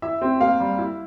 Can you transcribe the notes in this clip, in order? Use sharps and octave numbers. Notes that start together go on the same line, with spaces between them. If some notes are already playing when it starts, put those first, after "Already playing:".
E4 E5
C4
A#3 F5
G3
E4